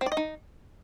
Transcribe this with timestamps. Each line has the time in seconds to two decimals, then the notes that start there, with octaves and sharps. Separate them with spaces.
0.01 C4
0.06 D5
0.12 D#5
0.17 D#4